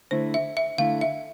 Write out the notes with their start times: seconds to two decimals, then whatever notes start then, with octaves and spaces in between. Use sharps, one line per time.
0.11 D3 A3 E4 C5
0.34 E5
0.57 E5
0.78 D3 A3 E4 F5
1.01 E5